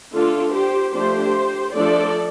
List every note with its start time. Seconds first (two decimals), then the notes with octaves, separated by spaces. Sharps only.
0.13 D3 A3 D4 F4 A4
0.52 G4 C5
0.93 F3 A3 D4 G4 C5
1.74 F3 A3 D4 A4 D5